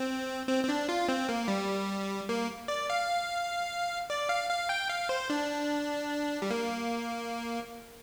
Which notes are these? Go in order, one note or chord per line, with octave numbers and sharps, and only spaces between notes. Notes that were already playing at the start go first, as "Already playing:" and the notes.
Already playing: C4
C4
C4
D4
F4
C4
A#3
G3
A#3
D5
F5
D5
F5
F5
G5
F5
C5
D4
G3
A#3